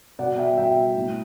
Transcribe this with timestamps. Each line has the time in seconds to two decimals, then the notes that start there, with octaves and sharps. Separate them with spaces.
0.19 B2 D5 F#5
0.38 E5 G5
0.57 B2 E5 G5
0.96 A2